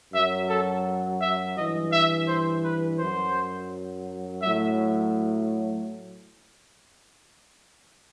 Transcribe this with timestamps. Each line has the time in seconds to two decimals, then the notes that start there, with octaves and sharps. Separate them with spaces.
0.13 F#2 F#3 E5
0.49 A4
1.20 E5
1.56 G2 E3 D#5
1.93 E5
2.28 C5
2.64 B4
2.99 F#2 F#3 C5
4.42 A2 F#3 E5